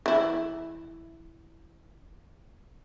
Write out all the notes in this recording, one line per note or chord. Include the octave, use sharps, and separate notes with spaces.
E3 E4